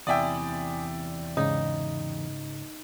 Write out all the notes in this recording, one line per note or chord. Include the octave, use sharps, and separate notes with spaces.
E2 C3 E4 D5 E5 G5 G#5 D#6
G#2 C#3 D#4